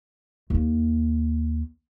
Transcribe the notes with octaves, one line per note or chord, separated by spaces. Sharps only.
D#2 A#3